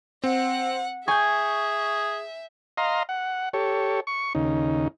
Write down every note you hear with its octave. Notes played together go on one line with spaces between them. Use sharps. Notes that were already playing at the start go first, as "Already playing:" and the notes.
C4 F#5
G#4 E5 G#5 C#6 G6
D#5 F5 A#5 C6
F#5
G4 A4 C#5
C#6
D#2 C#3 D#4